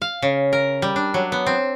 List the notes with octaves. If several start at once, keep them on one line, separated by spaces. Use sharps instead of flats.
F5
C#3
A#4
G3
D4
F#3
B3
C4